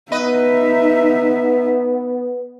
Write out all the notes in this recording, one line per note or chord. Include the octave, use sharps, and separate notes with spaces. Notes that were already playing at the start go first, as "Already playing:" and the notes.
B3 D#4 B4 D#5 E5